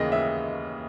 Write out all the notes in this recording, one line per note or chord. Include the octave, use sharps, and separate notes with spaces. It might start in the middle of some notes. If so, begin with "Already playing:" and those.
Already playing: D#2 C#3 E3 A#3 D#5
E5